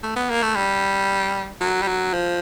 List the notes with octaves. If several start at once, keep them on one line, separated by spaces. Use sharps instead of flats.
A3
B3
A#3
A3
G3
F#3
G3
F#3
F3